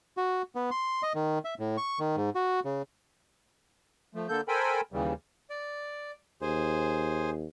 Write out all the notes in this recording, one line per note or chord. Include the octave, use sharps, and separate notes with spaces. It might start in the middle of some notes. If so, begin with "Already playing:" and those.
F#4
B3
C6
D#5
D#3
E5
A2
C#6
D#3
G#2
F#4
C#3
F3 A3
D3 A#3 A4 G6
A4 A#4 C5 G5 G#5 B5
D#2 C#3 E3 G3
D5
D#2 G#4 C5